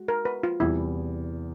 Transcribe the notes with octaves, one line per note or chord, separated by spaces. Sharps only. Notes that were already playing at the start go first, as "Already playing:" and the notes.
Already playing: G#3 F#4
A#4
B4
F4
E2 C3 E3 G3 E4